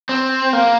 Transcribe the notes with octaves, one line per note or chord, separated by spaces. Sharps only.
C4
A#3